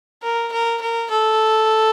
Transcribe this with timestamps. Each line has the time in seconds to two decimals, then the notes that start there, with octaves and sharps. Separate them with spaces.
0.23 A#4
0.52 A#4
0.81 A#4
1.10 A4